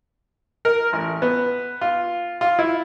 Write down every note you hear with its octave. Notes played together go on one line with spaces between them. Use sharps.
A#4
A1
B3
F4
F4
E4